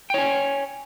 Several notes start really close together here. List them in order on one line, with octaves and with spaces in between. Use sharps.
G5 C#5 G#5